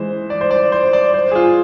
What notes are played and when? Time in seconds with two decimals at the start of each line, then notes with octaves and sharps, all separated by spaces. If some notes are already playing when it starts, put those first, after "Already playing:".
Already playing: E3 G#3 C5
0.30 D5
0.41 C5
0.51 D5
0.72 C5
0.93 D5
1.14 C5
1.31 G#4
1.35 F4